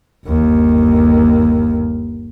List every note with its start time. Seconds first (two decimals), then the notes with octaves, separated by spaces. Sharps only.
0.27 G1 D#2